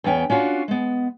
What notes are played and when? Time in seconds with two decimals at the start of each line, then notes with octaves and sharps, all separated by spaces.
0.04 E2 B3 C#4 G5
0.30 C#4 D4 F4 F#4
0.68 G#3 B3